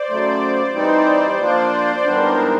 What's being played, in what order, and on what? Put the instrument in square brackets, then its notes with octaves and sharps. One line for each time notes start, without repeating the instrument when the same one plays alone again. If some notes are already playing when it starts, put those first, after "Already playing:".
Already playing: [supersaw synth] C5 D5
[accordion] C#3 F#3 A3
[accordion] E3 G3 C4 D#4 [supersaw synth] C5 D5
[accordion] F3 A#3 D4 F4 [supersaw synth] C5 D5
[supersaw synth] C5 D5
[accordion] G#2 E3 G3 B3 D4 [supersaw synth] A#4 C5